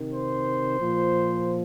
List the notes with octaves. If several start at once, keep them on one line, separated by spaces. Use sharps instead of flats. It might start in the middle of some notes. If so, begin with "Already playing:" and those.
Already playing: C3 D#3
C5
A#2 F3